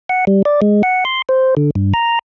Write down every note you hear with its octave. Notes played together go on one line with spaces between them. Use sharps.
F#5
G3
D5
G#3
F#5
C6
C5
D3
G2
A#5